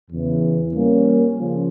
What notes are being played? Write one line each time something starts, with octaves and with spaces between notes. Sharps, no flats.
E2 C#3 E3
G3 A#3 C#4
C#3 F3 C#4